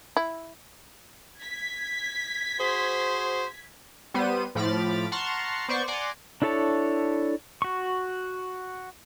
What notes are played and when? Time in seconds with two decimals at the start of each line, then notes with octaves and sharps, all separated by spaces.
0.17 E4
1.41 G#6 B6
2.60 F#4 G#4 C5
4.14 G3 B3 C5 D#7
4.55 A2 F3 B5 D6 F6 A6
5.12 F#5 A5 A#5 C6 C#6 F6
5.69 B3 C5 D5 C#6
5.88 D5 F#5 G#5 A#5 C6 D6
6.42 D4 E4 A4 C#5 A5
7.62 F#4 C#6